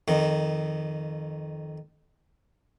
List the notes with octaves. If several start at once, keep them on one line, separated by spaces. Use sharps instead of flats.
F2 D#3